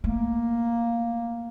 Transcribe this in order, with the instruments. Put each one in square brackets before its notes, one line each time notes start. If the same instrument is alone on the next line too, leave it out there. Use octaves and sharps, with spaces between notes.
[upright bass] A3 [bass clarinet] A#3